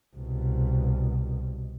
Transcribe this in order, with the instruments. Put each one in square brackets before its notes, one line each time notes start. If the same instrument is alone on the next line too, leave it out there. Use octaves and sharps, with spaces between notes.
[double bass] C2 B2